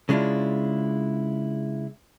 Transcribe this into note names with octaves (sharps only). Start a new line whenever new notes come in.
C#3 G#3 D4 E4 F4